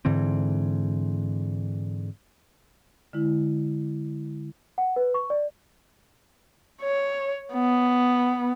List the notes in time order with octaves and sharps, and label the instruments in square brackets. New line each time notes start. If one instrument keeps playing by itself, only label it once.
[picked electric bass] G#2 D3 E3 C4
[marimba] D3 G#3 E4
[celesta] F#5
B4
C#6
D5
[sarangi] C#5
B3